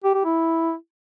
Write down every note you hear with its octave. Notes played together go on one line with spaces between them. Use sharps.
G4
G4
E4